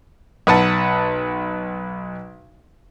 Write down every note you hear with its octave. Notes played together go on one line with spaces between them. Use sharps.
B1 B4 F#5 A5